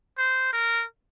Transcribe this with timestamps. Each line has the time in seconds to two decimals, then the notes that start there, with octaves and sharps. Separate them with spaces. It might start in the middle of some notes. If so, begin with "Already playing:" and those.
0.18 C5
0.53 A#4